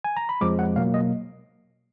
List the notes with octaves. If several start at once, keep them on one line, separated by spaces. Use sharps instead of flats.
G#5
A#5
B5
F2 F3 G#3 D6
F#5
B2 F#3 A#3 F5
D#5